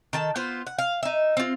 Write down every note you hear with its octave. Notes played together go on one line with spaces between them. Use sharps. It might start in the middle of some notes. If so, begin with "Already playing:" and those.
D#3 A4 A5
B3 F4 C5
F#5
F5
D#4 E5
C4 F4